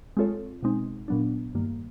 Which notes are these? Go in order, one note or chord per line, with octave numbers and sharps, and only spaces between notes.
G#3 C4 F4 A4 C#5
B2 G#3 C4 D#4
A#2 F#3 B3 D4
G2 D#3 G3 A#3